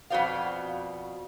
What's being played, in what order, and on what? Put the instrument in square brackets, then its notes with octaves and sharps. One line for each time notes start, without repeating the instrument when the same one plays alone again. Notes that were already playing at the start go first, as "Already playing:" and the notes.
[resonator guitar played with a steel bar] F2 B2 F#4 C5 D5 F5